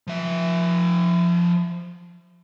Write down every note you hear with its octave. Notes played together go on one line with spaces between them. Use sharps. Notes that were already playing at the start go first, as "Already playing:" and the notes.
F3 E5